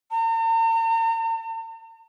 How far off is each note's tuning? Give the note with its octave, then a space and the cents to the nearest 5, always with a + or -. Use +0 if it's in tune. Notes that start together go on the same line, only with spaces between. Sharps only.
A#5 -45